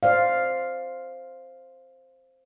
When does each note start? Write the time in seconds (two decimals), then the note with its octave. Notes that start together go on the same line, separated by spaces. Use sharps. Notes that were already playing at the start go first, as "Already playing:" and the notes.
0.03 C5 D5 F5